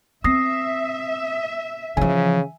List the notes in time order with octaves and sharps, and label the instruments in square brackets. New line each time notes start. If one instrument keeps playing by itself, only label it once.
[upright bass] C4 [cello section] E5 [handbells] D#6 A#6 C7
[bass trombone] C#3 [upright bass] E3 F3 [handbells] G#5